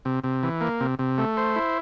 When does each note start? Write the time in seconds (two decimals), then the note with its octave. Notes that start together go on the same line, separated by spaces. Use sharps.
0.05 C3
0.24 C3
0.43 E3
0.61 A#3
0.80 C3
0.99 C3
1.18 A3
1.37 C5
1.56 E4